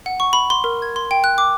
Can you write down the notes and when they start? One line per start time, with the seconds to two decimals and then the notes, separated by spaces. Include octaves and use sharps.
0.06 F#5
0.20 C#6
0.33 B5
0.50 C6
0.64 A#4
0.82 G#6
0.96 C6
1.11 G5
1.24 F#6
1.38 D6